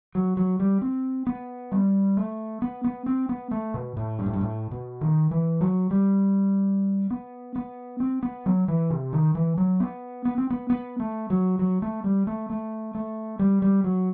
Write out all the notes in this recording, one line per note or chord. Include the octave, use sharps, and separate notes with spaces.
F#3
F#3
G3
C4
B3
G3
A3
B3
B3
C4
B3
A3
B2
A2
G2
A2
G2
A2
B2
D#3
E3
F#3
G3
B3
B3
C4
B3
F#3
E3
C3
D#3
E3
F#3
B3
B3
C4
B3
B3
A3
F#3
F#3
A3
G3
A3
A3
A3
G3
G3
F#3